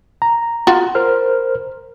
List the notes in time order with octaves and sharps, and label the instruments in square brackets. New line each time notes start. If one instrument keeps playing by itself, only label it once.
[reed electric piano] A#5
[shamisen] F4 F#4
[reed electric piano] A#4 C5 F6